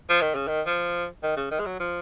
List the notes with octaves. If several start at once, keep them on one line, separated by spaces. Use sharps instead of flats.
F3
D#3
C#3
D#3
F3
D#3
C#3
D#3
G#3
F#3
F3